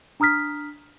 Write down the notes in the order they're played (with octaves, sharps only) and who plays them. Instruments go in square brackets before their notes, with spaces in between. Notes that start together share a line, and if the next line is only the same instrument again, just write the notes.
[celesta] D4 A#5 D#6 F6 B6